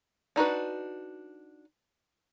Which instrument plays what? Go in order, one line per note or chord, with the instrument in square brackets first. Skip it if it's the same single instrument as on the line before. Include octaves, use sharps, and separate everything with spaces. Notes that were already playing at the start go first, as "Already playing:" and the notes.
[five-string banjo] D4 D#4 F#4 B4